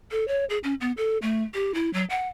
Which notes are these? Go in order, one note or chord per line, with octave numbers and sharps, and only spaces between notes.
A4
C#5
G#4
C#4
B3
A4
A3
G4
E4
F#3
F#5